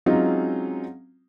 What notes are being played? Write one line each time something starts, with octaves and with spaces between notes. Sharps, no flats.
F#3 G#3 C4 C#4 D#4 F4